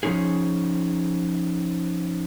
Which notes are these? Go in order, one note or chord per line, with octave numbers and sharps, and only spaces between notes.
F3 C#4 D#4 G#4